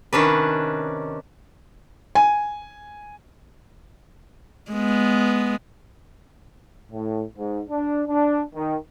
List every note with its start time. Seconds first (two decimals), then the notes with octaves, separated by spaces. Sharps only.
0.13 C3 D#3 C#4 D4 B4
2.15 G#5
4.72 G#3 B3
6.91 A2
7.37 G#2
7.69 D4
8.08 D4
8.54 D#3